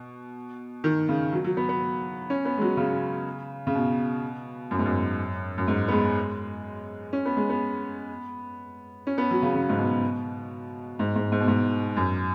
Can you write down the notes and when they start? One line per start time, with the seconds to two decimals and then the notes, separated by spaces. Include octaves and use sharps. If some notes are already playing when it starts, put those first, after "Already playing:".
Already playing: B2
0.84 D#3
1.09 C#3
1.33 F#3
1.44 F#3
1.57 B3
1.69 B3
2.30 C#4
2.45 B3
2.58 G#3
2.61 F#3
2.77 C#3
3.67 C#3
3.75 B2
4.71 F#2
4.79 G#2
4.86 F#2
5.58 F#2
5.68 G#2
5.88 B3
5.92 G#3
7.13 C#4
7.26 B3
7.37 G#3
7.50 B3
9.07 C#4
9.18 B3
9.31 F#3
9.42 C#3
9.55 C#3
9.69 G#2
9.78 B2
10.99 G#2
11.16 G#2
11.32 G#2
11.40 B2
11.48 G#2
11.97 F#2